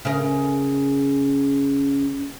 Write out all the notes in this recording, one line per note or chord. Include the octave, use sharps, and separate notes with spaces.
C#3 A#4